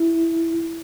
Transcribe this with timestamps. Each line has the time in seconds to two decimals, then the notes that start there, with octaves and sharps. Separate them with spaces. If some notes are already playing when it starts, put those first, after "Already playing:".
Already playing: E4